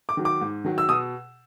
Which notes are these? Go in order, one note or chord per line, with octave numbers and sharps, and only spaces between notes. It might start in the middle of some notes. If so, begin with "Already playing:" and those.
D6
D#3 F#3
D6
G#2
D#3 F#3
E6
B2 D#6